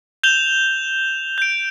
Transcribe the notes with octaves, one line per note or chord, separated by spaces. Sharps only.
G6 E7 F7 G7
G6 D7